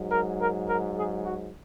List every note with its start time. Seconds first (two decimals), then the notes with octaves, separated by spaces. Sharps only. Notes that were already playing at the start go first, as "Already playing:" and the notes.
Already playing: G#2 F#3
0.08 A#4
0.37 A#4
0.66 A#4
0.94 G#4
1.23 F#4